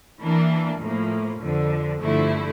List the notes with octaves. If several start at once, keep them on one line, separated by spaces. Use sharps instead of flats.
E3 A#3 D4
A2 F3 A#3
F2 D3 F3
G2 D3 F3 A3 E4